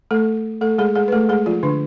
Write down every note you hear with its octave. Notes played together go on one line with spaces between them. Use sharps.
A3 A4
A3 A4
G#3 G#4
G#3 G#4
B4
A3 A4
G#3 G#4
F3 F4
D3 D4